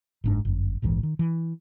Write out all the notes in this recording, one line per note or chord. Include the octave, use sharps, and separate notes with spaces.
F#1 G#2 D4
G1 F#2
D1 A#1 G#2 E3
D#3
E3